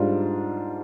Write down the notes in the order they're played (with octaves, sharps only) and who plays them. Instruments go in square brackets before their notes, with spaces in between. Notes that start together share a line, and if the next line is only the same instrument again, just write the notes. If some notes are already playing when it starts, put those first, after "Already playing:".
Already playing: [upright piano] G#2 G3 D4 F4